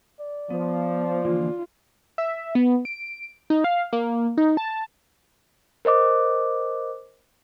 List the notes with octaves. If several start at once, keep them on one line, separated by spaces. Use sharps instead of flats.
D5
F3 B3
D3 E3 A#3 F4
E5
B3
D7
D#4
F5
A#3
D#4
A5
A#4 C5 D#5 D6